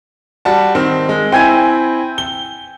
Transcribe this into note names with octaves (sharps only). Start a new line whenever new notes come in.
G3 F#4 A5
D#3 C4
G#3
C4 E4 G5 G#5 D#7
G7